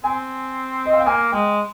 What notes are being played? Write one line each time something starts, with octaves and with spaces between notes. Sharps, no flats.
C4 G#5
D#5
F5
G5
A#3 G#5
G#3 G5